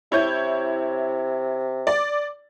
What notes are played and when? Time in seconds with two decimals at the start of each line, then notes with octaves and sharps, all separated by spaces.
0.12 C3 E4 C#5 G6
1.87 D5